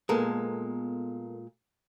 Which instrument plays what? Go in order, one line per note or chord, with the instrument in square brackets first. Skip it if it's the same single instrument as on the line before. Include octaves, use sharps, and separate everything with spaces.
[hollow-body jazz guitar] A#2 G#3 [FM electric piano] B3 A4 A#4